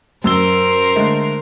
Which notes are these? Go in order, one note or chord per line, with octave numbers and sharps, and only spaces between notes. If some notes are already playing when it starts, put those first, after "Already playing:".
F#2 A#4 C5 E6 G7
D3 G#3 A3